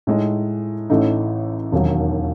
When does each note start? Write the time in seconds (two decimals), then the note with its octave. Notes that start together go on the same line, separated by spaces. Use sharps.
0.07 A2 G#3 D#4
0.90 A1 A2 E3 A3 D#4
1.72 E1 D#2 D#3 F#3